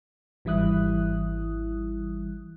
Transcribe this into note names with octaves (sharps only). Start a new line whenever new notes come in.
G#1 E3 G3 E4 D#6 F#6